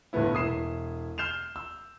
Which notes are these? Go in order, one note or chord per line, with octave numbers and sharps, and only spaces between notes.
G1 A2 A3 B3 E4
E1 E4 D#6 C7 E7
F6 G6 C7 E7 F7
E6